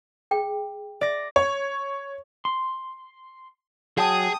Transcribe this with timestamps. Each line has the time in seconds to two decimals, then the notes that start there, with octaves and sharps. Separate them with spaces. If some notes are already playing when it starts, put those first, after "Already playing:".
0.31 G#4 G5
1.01 D5 A#6
1.36 C#5
2.45 C6
3.98 F#3 G#4 G5 A5 D#6